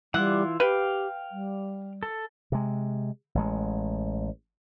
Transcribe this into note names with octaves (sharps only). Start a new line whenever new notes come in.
E3 G3 E4 F4 F#5
G4 B4 F5 G5
G3
A4
C3 G#3
A1 G#3